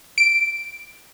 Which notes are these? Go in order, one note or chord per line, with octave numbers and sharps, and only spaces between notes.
D7